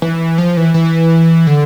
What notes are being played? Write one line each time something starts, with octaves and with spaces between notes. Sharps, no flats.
E3
F3
E3
E3
D3